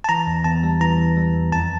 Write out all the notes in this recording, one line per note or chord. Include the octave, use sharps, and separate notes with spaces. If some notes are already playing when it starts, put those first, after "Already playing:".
A5
E3 A#5
E2
E2 A5
G3
E3 A#5
E3
G3
E2
F2 A5